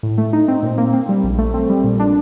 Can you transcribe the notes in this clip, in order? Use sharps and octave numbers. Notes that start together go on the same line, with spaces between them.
A2
A3
D#4
C4
A#2
A#3
C4
G3
A#1
A3
C4
G3
A#2
D4